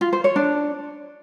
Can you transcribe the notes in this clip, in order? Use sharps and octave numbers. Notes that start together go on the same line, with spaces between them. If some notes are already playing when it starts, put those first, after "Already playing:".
F4
C5
C#5
D4